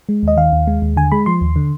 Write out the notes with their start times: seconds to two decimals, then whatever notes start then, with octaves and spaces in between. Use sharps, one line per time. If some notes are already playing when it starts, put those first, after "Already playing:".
0.09 G#3
0.23 D#2 D#5
0.37 D#3 F5
0.53 D#2
0.67 G#3
0.82 D#2
0.97 D3 G#5
1.12 G#3 B5
1.26 F3 C6
1.41 D#2
1.56 D3